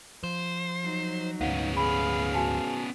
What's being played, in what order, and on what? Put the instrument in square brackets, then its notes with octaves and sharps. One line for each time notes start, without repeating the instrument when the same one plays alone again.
[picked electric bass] F3 [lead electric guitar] C5
[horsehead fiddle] F#3 D#4
[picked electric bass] D2 G#2 [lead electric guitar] B3 C#4 [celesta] F5 F#5
[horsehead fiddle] G#4 F5 [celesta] B5
[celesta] F#4 G#5 A5